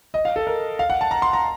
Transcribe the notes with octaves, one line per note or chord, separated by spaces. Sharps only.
D#5
F5
A4
A#4
F5
F#5
A5
A#5
C6
A#5